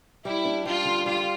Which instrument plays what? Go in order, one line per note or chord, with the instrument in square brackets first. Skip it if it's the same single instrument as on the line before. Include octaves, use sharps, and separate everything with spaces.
[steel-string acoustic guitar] G3 [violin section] E4
[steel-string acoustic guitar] D4
[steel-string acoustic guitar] G3 [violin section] F4
[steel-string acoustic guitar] D3
[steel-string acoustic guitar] G3 [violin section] F4